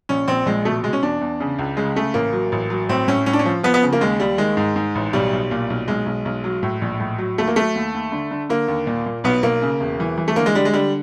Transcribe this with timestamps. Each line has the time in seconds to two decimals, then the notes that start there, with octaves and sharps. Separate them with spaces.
0.09 A#1 C#4
0.28 A#1 C4
0.46 A#1 G#3
0.65 B2 A3
0.84 B2 G#3
0.93 C#4
1.02 E2 D4
1.21 E2
1.40 C#3
1.58 C#2
1.77 C#3 G#3
1.96 C#3 A3
2.14 A1 A#3
2.33 F#3
2.52 A1
2.70 F#3
2.89 A2 C4
3.08 A2 C#4
3.26 A2 C#4
3.33 D4
3.39 C#4
3.45 F3
3.63 F3 B3
3.74 B3
3.82 C#3
3.93 A#3
4.01 D#2 G#3
4.20 D#2 G3
4.38 D#3 G#3
4.57 G#2
4.76 G#2
4.95 A1
5.13 B1 G3
5.33 B1
5.51 A#2
5.70 B1
5.88 B1 G#3
6.06 B1
6.25 B1
6.44 F#3
6.63 A2
6.81 A#1
7.00 A2
7.18 F#3
7.38 D#2 A3
7.47 A#3
7.56 F#3 A3
7.75 D#2
7.94 D#2
8.12 D3
8.31 D3
8.49 D3 A#3
8.68 D#2
8.87 A#2
9.06 A#2
9.24 B1 B3
9.43 B1 A#3
9.62 C#3
9.80 E1
10.00 E3
10.18 E3
10.28 A3
10.36 D3 A#3
10.46 G#3
10.55 D3 G3
10.65 G#3
10.73 D3 G3